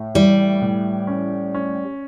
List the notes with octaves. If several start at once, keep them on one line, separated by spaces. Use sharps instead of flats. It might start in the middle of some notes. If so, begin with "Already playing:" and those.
Already playing: A2
E3 G3
A2
C#4
C#4